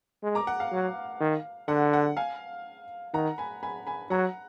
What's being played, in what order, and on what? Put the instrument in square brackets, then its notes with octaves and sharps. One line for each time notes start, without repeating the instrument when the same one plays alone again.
[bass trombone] G#3
[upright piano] A#5 D6
F#5
F5
[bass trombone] F#3
D#3
[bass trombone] D3 [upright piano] F#5
[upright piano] F#5
F5 G#5
[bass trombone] D#3 [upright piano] F#5 A#5
[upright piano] G#5 B5
G#5 B5
G#5 B5
[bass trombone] F#3 [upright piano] F#5 A#5